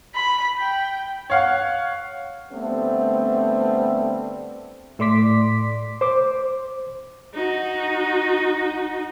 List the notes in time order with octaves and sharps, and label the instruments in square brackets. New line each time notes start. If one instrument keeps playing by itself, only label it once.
[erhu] B5
G5
[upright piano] C#5 F5 F#5
[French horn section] D3 G3 A3 B3 C4
[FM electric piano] A2 A3 D5 C6 D6 B6
[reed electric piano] C5 D6
[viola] D#4 F#4